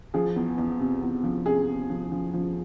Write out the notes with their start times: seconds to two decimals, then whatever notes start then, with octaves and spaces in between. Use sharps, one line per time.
0.14 F3 G#4
0.36 E2
0.58 E2
0.80 C3
1.02 E2
1.24 F3
1.46 C3 G#4
1.68 C3
1.90 F3
2.12 F3
2.33 F3